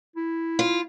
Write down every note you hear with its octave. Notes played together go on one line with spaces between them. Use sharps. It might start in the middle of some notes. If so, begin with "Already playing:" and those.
E4
F4